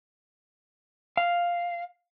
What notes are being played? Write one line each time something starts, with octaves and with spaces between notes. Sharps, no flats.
F5